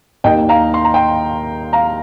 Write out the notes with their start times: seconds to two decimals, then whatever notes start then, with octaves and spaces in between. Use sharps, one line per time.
0.24 D#2 D#3 A#3 D#5 G5
0.49 F5 A#5
0.74 C6
0.85 A#5
0.94 G5 C6
1.73 F5 A#5